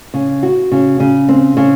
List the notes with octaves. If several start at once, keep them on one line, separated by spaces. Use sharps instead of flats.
C#3
F#4
C#3
C#3
C4
C#3